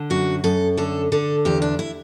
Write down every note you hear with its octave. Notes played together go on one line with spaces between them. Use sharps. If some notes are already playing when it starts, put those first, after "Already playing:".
Already playing: D3
F#2 F#4
F#2 A4
D3 A4
D3 A4
E2 G4
D4
E4